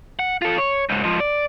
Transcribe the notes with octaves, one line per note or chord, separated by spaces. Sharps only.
F#5
F4 A4
C#5
C#2 G#2
G#2 F3
D5